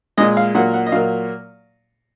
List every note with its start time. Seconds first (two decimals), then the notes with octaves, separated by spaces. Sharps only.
0.18 A#2 G#3 D#5
0.37 F5
0.55 A#2 F#3 A#3 F#5
0.74 F#5
0.86 D#5
0.92 A#2 F#3 A#3 F5